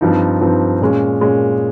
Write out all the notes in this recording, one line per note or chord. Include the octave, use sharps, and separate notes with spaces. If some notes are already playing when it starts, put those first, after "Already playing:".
G2 F3 C4 D#4
G2 F3 C4 D#4
A#2 G#3 C#4
A#2 G#3 C#4